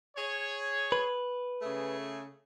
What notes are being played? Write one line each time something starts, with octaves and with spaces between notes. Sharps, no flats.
G#4 C#5
B4
C#3 A3 G#4